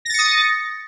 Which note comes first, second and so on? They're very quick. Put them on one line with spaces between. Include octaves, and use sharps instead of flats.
A#6 A6 C#7 D#6